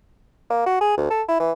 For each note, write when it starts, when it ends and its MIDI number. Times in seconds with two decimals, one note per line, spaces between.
0.50 0.65 58
0.66 0.79 66
0.81 0.97 68
0.97 1.09 38
1.10 1.23 69
1.29 1.39 64
1.40 1.52 52